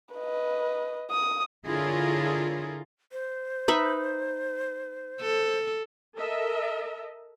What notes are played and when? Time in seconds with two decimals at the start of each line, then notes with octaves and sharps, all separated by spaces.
0.15 B4 D#5
1.11 D#6
1.66 D3 E4 F4 G#4 A#4 C#5
3.12 C5
3.68 D#4 B4 E5
5.21 A4
6.16 A4 A#4 D#5 E5